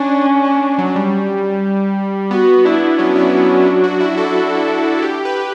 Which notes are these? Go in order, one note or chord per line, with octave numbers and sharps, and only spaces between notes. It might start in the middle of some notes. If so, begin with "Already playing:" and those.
Already playing: C#4 D4
D4
D4
F#3
G3
B3 F#4
B3
D4 E4
D4
F#3 C#4
E4
E4
D4
F#4
E4
A4
G4
B4